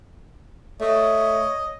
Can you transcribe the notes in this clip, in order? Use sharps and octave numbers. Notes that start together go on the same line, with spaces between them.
A3 C#5 D#5